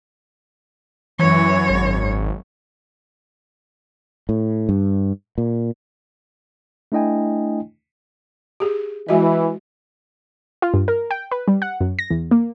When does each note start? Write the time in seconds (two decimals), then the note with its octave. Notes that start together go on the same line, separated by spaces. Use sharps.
1.19 F#2 E3 C#5
1.70 G#1
4.29 A2
4.69 G2
5.38 A#2
6.92 A3 D4 E4 D#5 G5 G#5
8.60 G4 G#4
9.09 E3 G#3 F#4 D#5
10.62 F4
10.74 G2
10.88 A#4
11.11 G5
11.31 B4
11.48 G3
11.62 F#5
11.81 F#2
11.99 A#6
12.10 E2
12.31 A#3